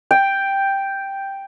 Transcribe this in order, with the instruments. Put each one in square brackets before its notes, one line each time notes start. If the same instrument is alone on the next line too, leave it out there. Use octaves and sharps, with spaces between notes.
[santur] G5